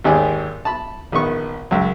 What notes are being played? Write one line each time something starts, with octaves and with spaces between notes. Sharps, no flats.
G#1 D#2 G#2 D#3 G4 G#4
A5 B5
A#1 D#3 B3 C#6
C#2 F#2